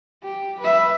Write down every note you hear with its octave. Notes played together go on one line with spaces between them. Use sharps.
G4
B4 E5